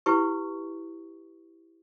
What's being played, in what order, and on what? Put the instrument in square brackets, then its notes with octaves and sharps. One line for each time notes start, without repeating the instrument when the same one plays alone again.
[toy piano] E4 G4 B4 C#6